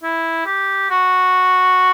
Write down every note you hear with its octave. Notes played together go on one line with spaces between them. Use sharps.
E4
G4
F#4